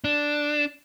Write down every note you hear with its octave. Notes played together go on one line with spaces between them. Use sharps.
D4